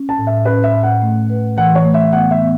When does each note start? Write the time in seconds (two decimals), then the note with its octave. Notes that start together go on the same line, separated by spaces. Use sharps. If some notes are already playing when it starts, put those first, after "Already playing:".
Already playing: C#4
0.09 A5
0.18 A2
0.27 E5
0.45 C#4 B4
0.64 E5
0.73 A2
0.83 F#5
1.02 A3
1.30 B4
1.57 E3 F#5
1.75 C#5
1.85 A3
1.94 E5
2.12 B3 F#5
2.31 E5
2.41 B3